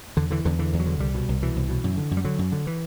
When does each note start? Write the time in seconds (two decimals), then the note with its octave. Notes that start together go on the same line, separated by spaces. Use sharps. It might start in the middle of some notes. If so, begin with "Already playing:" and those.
0.17 E2 D3
0.31 D3 E3
0.45 E2 D3
0.59 D3 E3
0.73 E2
0.80 F#3
0.86 D3
1.00 C2 G3
1.15 B2
1.29 C2
1.42 B2 E3
1.56 C2
1.69 B2
1.84 F#2
1.97 D3
2.11 F#2
2.17 G3
2.25 D3 F#3
2.39 F#2
2.52 D3
2.67 E3